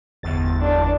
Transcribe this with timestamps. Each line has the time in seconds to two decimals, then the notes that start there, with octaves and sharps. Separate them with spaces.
0.23 G1 E2 A6
0.60 D4